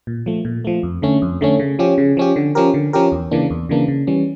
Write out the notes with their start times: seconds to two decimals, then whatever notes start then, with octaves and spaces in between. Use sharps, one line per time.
0.07 A#2
0.26 F3 A3
0.45 A#2
0.65 F3 A3
0.83 F2
1.02 D3 A3 C#4
1.22 F2
1.41 D3 A3 C#4
1.59 C#3
1.79 F3 C#4 G4
1.98 C#3
2.17 F3 C#4 G4
2.36 D3
2.55 F3 C#4 G4 A#4
2.74 D3
2.93 F3 C#4 G4 A#4
3.12 E2
3.31 C#3 E3 A#3 D4
3.50 E2
3.69 C#3 E3 A#3 D4
3.88 C#3
4.07 E3 G3 C#4